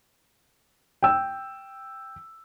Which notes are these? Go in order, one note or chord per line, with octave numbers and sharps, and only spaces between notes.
G5 E6